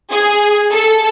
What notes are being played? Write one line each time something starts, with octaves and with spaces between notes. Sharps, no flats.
G#4
A4